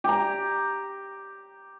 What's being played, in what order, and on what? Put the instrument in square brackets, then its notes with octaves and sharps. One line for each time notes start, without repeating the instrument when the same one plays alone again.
[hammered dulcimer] G4 A#5